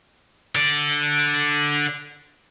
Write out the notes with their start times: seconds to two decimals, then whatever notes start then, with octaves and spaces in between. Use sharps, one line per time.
0.55 D3 D5